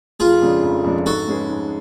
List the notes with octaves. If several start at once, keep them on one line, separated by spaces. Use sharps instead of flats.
F1 F4 G#4
F2 C#3 G#3 D4
F1
F2 C#3 G#3 D4
G#2 F#4 A4
G#3 C#4 G#4 B4
G#2